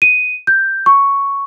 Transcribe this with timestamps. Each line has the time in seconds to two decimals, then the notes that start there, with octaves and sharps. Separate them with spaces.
0.02 D#7
0.47 G6
0.86 C#6